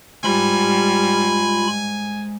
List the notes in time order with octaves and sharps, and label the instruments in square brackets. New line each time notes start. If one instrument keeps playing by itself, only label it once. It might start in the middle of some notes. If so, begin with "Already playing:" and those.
[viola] G3 [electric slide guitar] G#3 C5 [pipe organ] F4 B5 [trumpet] G#5